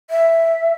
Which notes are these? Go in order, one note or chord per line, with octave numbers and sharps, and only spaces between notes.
E5